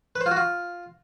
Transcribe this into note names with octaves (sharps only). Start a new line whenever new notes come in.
B4
C5
F4
F#4
F4